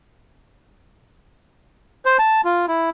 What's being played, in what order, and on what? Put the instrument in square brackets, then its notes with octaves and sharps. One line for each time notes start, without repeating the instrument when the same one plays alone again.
[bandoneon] C5
A5
F4
E4